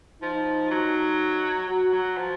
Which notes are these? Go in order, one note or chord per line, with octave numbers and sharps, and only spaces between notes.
F3 D#4
F#3
F#3 F#4
F#3
F3